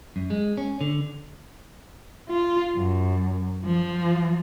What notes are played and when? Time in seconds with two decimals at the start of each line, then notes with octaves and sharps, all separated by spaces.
0.16 F#2
0.30 G#3
0.57 C#4
0.81 D3
2.29 F4
2.76 F#2
3.65 F3